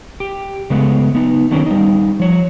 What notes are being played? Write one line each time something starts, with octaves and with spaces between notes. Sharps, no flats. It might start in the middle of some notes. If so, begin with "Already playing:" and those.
G4
C#3 G#3 A3 B3
B3 D#4
D3 D#3 F#3 C4 C#4
G3 D#4
F3 C#5